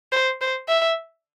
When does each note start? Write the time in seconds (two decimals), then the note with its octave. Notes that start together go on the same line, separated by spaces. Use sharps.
0.12 C5
0.41 C5
0.68 E5